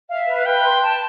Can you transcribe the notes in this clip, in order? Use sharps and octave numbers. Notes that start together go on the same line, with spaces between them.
E5 F5
B4
F5
B4 G5
C6
A5